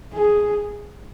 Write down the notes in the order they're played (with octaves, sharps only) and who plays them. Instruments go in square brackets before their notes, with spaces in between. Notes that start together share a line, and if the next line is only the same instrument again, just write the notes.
[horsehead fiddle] G#4